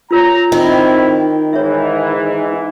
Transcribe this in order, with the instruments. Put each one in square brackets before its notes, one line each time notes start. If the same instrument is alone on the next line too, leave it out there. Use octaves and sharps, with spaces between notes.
[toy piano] F4 A#4 C#5 [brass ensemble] A#5
[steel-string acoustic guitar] D#3 [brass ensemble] C4 E4 [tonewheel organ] D#4
[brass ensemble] G#2 E3 [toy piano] C#5 E5